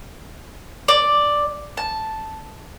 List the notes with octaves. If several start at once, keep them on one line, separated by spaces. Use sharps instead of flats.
D5
A5